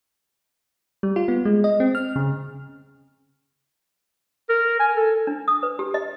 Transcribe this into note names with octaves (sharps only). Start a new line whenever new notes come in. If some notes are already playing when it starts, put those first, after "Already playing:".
G3
F4
B3
G#3
D#5
C4
F6
C#3
A#4
G#5
A4
D4
D#6
B4
G4
D#5